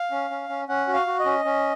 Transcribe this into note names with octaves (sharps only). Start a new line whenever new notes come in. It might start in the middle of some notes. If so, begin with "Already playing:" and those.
Already playing: F5
C#4
C#4
C#4
C#4 F#5
F#4
F5
F#4
D#5
C#4
C#4